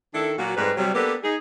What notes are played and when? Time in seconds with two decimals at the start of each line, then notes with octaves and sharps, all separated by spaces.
0.14 D#3 D4 E4 A4
0.37 A#2 F#3 A#3 F#4
0.56 F2 G#2 G3 G#3 B4
0.77 C3 F#3 G3
0.94 A#3 B3 D4 G4 A4 B4
1.23 D#4 G#4